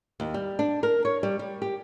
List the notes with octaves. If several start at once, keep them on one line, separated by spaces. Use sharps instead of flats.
D#2
G3
D4
A#4
C#5
G3
G3
G4